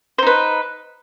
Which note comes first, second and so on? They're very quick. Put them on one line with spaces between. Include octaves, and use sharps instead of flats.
C5 D#4 B4